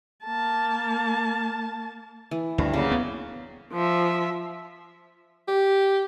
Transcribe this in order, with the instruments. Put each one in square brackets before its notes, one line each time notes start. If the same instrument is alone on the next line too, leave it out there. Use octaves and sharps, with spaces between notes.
[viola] A#3 A5
[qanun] E3
[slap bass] D2 [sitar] G2
[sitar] C#3 F#3 [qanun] A#3
[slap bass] B3
[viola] F3 E5
[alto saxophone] G4